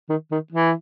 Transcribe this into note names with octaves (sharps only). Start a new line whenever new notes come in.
D#3
D#3
E3